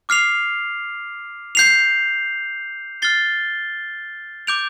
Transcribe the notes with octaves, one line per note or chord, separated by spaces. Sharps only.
D6 F6 C7 F7
G6 C7 F7
F6 A6 C7 G7
D6 G6 D7 F7